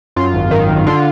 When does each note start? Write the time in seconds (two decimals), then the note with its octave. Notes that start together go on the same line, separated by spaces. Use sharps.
0.16 F#2 F4
0.34 G#1
0.51 D#3
0.69 G#1
0.86 D3 F4